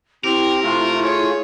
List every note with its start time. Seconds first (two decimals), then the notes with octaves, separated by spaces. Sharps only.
0.24 C4 E4 G4 A#4
0.63 C3 A3 F4
1.05 G#4 C#5